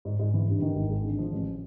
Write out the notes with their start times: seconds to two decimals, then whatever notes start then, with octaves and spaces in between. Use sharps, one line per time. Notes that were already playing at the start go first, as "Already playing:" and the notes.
0.05 G#2
0.19 G#2
0.34 E3
0.48 G2
0.62 D#3
0.75 G#1
0.90 G#3
1.04 D3
1.19 F3
1.32 A1